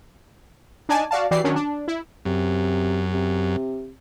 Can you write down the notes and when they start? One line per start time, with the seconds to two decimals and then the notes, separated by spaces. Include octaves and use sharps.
0.89 D4 D#4 D5 G#5 A5
1.11 F#4 D5 F5 A5
1.31 E3 F#4 G4 D5 C7
1.44 D#3 F#3 C#4 D4
1.56 D4
1.88 E4
2.25 F#2 C3
3.13 C3